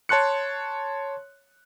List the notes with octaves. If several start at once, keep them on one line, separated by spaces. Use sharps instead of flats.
C#5 A5 C6 F#6 C#7